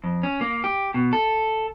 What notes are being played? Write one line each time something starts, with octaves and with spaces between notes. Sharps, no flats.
F2
C#4
A#3
G4
B2
A4